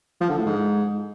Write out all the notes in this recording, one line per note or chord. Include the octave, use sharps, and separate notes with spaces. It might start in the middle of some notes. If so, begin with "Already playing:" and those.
F3
D3
A2
G#2